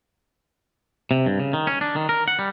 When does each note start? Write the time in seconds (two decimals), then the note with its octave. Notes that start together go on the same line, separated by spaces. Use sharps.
1.11 C3
1.26 G2
1.40 C#3
1.53 D#3
1.67 C#4
1.81 D4
1.96 D#3
2.09 A#4
2.28 F#5
2.39 G3